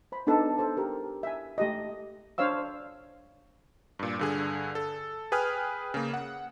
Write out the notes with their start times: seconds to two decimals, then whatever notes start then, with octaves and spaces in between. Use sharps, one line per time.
0.12 C5 B5
0.27 B3 D4 D#4 A4 D5 A5
0.58 A4 C5 A5
0.77 G4 A#4
1.23 E5 G#5
1.58 A3 G4 D#5
2.38 D4 C5 C#5 F5 E6
3.99 G2 A#2
4.19 G2 D3 G#4
4.75 A4
5.32 G#4 B4 G5 G#5 D#6 F6
5.94 C#3 A#3
6.14 F#5